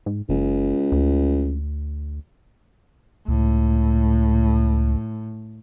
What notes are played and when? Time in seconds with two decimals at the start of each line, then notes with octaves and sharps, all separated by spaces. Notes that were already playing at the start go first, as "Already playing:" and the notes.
0.06 G#2
0.29 F#1 C#2
0.92 D2
3.28 C#2 A2